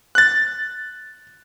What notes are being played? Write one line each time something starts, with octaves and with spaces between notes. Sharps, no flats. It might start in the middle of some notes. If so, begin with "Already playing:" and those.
F#6 A6